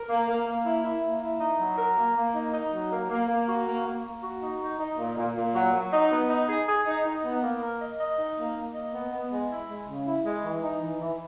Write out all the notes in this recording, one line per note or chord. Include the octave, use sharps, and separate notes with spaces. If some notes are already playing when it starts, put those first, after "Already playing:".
Already playing: A#4
A#3
A#3
A#3
E4
E4
A#3
E4
D#4
F#3
A#4
A#3
A#3
D#4
D#4
F#3
A#3
A#3
A#3
F#4
A#3
A#3
A#3
F#4
D#4
D#4
D#4
A#2
A#2
A#2
F#3
F#3
D#4
B3
D#4
G#4
G#4
D#4
D#4
B3
A#3
A#4
D#5
D#5
D#4
A#3
A#3
D#5
B3
B3
G#3
E4
G#3
C#3
E4
G#3
E3
D#4
E3
E3